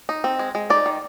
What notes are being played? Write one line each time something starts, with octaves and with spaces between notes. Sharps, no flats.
D#4
C4
G#3
G#3
D#4 D5
D#3